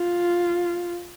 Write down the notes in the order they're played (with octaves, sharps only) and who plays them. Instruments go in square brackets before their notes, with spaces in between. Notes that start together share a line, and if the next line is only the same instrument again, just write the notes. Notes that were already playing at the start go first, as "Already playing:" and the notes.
Already playing: [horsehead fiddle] F4